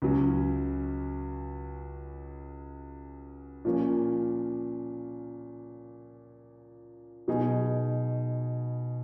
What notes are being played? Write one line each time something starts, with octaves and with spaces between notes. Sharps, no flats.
C#2 C#3 F#3
A#2 F3 A#3 C#4
B2 F#3 B3 D#4 G#4